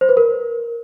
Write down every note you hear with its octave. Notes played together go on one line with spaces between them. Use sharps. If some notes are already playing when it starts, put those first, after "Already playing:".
C5
B4
A#4